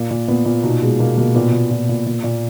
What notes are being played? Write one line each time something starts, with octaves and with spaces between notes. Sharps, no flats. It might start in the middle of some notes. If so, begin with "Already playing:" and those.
Already playing: A#2 A#3
A#2
A#2 B3
A#2
B2 D#4
B2 G#3
B2 A#3
B2 A#3
A#2 B3
A#2
A#2
A#2
A#2
A#2